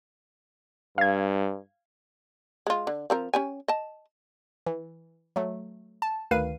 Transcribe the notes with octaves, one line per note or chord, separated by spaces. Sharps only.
G2 F5 G#6
G#3 F4
D3
F3 C4 A#4
C#4 G4 G#5
D#5 A5
E3
F#3 A3
A5
D2 D#3 B4 F5 C7 D#7